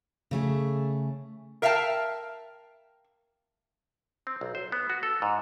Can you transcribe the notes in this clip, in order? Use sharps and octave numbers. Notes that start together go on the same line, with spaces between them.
C#3 A3 G#4
A#4 E5 F5 G5 A5
C4
B1
C5
B3
F#4
A4
G#2